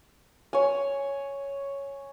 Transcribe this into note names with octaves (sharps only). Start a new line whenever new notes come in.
C#5 G#5